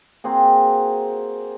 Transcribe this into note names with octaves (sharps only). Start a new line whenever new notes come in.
A#3 C4 F#4 G#4